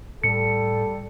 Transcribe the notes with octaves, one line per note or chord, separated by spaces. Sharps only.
A2 G3 A4 C#7